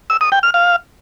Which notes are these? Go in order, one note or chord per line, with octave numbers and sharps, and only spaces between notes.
E6
D#6
G5
F6
F5